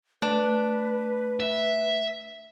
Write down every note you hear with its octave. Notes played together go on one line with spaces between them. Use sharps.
A3 D4 B4
E5